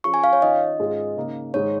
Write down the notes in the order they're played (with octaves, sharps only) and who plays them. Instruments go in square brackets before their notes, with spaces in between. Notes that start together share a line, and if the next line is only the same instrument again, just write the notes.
[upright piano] F3 C#4 F4 G#4 [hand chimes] C#6
[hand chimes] G#5
F5
C#5
[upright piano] D#3 C#4 F4 [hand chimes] D#5
[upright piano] G#2 G#3 C#4 F4 G#4
C#3 A#3 D#4
[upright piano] G#2 D#3 G#3 [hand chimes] C#5